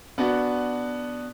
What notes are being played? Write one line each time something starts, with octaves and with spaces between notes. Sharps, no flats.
B3 D4 F#4